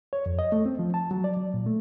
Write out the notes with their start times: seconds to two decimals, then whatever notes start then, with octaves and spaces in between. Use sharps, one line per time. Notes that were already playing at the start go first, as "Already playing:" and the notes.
0.13 C#5
0.26 F2
0.39 D#5
0.52 A3
0.66 C4
0.79 F3
0.94 A5
1.11 F#3
1.24 D5
1.37 F#3
1.54 A#2
1.66 A3